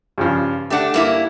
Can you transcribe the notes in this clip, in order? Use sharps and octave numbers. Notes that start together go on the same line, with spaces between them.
G2 C#3 F3
A3 D4 G4 D5 F#5
G2 A#3 E4